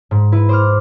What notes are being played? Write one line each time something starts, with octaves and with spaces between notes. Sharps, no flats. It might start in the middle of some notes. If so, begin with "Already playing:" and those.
G#2
E4 B4
C5 D6 F6